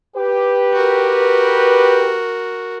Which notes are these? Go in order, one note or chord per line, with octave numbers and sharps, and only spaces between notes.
G4 B4
F#4 A#4